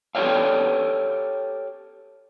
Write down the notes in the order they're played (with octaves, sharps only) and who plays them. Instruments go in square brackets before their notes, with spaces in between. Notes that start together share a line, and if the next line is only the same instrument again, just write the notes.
[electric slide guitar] G4 A4 C#5 D5 F5